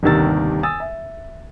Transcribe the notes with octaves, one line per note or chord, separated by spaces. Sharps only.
G1 D#2 C3 D#3 E6 A6
G#5 D#6 E6 A6
E5